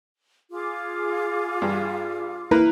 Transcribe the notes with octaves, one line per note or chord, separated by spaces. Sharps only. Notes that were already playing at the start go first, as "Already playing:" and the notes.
F4 G#4 D6
G2
A#3 E4 A#4 B4